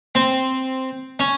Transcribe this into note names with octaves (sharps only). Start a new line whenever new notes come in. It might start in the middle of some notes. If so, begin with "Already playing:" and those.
C4
C#4